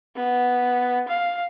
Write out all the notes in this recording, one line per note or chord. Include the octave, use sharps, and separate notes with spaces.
B3
F5